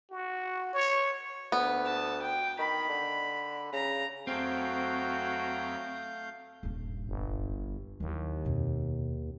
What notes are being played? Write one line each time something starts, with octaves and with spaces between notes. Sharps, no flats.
F#4
C#5
D2 B3
A5
G5
D#3 B5
D3
C#3 A#5
F2 F#3 A3 C4 F#4 F5 G5 G6
D#1 G2
G1
D#2 F#3 E4
F2 B2